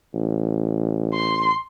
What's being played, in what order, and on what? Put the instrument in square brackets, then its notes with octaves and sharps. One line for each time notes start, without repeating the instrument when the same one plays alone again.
[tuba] A1
[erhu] C6